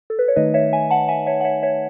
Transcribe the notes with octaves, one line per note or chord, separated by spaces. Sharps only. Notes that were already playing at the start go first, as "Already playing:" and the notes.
A4
B4
C#5
D#3 A3 D#4 B4 D#5
C#5 E5
E5 G#5
F#5 A5
E5 G#5
C#5 E5
F#5
C#5 E5
C#5 E5